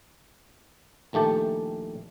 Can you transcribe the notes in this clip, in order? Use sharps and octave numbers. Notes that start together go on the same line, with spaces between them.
A#1 D#3 A3 G4 A5